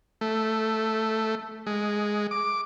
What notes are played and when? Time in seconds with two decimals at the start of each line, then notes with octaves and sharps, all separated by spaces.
0.21 A3
1.67 G#3
2.31 D6